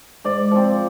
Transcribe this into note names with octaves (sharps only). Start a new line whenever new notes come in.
G#2 D5
F3 C4